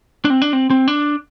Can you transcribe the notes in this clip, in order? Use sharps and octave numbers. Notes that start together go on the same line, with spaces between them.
D4
C4
D4
C4
C4
D4